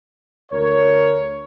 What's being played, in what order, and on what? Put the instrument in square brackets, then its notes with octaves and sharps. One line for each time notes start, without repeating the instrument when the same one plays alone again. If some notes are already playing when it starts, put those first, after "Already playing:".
[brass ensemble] D2 A#4 C#5